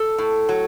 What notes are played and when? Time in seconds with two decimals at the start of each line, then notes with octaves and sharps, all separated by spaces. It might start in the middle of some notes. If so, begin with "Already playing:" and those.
Already playing: A4
0.18 A2
0.49 F#3